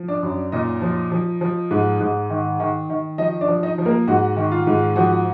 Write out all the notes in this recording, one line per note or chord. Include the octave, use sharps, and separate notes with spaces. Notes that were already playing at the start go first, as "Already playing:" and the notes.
Already playing: F3
D4 D5
F#2
A#2 D#4 D#5
F3
F3
F3
G#2
G#2
D#3
D#3
D#3
F3 D#4 D#5
D4 D5
F3
D#4 D#5
F3
A#3 A#4
G#2 F#4
D#3
F4
G#2
F3 F#4